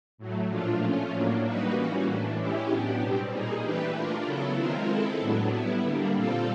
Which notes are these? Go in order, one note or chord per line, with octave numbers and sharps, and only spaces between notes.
A2 F#3 A3
A#2 F3 A3 D4 F4
F3 A3 C#4 F4
A2 F#3 A#3 D4
G3 A#3 D#4 F#4 B4
E3 G3 A#3 C#4 F#4
A2 E3 A3 D4
G#3 C#4 E4 G4
A2 F#3 B3 D4 G4
B2 G3 C4
A#2 G3 A#3 D#4 G#4
E3 A3 D4 G4 B4
A3 D4 F4 A#4
C#3 F#3 B3 E4 A4
D#3 G#3 C4 F4 A#4
G#3 C4 E4 A4
A2 F#3 B3 D4
G3 B3 E4
D3 G3 A#3 D4
A#2 G3 C4 F4 A4